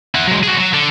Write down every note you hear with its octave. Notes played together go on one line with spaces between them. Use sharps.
E4 F#5
F#3 G#3
F#4 G#4
F#3
D3